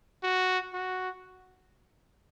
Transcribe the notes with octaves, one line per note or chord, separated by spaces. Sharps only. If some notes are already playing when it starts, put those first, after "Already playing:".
F#4
F#4